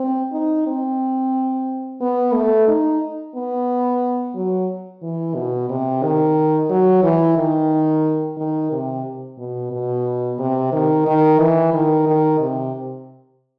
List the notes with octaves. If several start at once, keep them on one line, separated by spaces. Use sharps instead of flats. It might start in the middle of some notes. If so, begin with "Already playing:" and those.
Already playing: C4
D#4
C4
B3
A3
D#4
B3
F#3
E3
B2
C3
D#3
F#3
E3
D#3
D#3
C3
B2
B2
C3
D#3
D#3
E3
D#3
D#3
C3